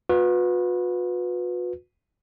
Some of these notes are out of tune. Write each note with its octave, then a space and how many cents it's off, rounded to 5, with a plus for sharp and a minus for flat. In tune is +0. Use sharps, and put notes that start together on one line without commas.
F#4 -45 B4 +0